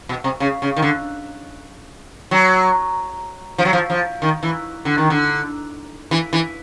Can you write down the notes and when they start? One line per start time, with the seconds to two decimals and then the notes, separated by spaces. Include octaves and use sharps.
0.09 B2
0.24 C3
0.40 C#3
0.62 C#3
0.76 D#3
0.82 D3
2.31 F#3
3.58 F3
3.65 F#3
3.73 F3
3.90 F3
4.22 D#3
4.43 E3
4.85 D3
4.98 D#3
5.10 D3
6.11 E3
6.33 E3